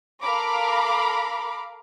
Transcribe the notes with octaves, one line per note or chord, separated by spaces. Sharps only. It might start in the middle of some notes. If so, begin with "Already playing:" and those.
A4 A#4 F5 A#5 B5 D6